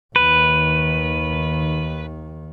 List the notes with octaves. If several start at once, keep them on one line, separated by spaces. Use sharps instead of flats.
D#2 D#3 B4